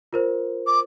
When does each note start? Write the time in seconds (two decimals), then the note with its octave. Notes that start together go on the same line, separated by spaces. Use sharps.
0.13 F4 A#4 C5
0.66 D6